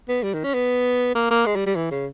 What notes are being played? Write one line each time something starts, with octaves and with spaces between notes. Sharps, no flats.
B3
G3
D#3
C#4
B3
A#3
A#3
G#3
G3
G3
E3
C#3